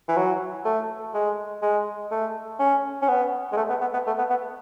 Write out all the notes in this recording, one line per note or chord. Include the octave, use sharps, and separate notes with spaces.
E3
F#3
A3
G#3
G#3
A3
C#4
C#4
B3
G#3
A3
B3
B3
B3
A3
B3
B3